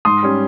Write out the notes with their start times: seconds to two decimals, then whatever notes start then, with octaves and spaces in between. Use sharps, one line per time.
0.05 G#2 C6 D#6
0.23 G3 C#4